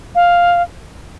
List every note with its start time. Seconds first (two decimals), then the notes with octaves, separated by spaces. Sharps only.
0.15 F5